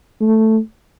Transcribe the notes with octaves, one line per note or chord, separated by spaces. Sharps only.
A3